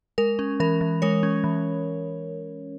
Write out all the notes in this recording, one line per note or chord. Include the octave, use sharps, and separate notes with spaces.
G#3 A#4
C#4
E3 A#4
E3
G#3 A#4 C#5
C#4
E3